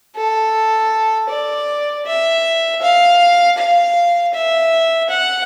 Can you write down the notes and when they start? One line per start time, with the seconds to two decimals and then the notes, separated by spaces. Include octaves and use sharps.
0.15 A4
1.29 D5
2.06 E5
2.81 F5
3.57 F5
4.34 E5
5.09 F#5